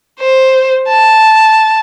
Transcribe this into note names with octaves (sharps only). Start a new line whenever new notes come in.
C5
A5